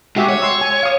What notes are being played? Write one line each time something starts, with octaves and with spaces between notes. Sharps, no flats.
G#3 F#4 G4 E5
C#5
C6 E6
G#5
F5 D#6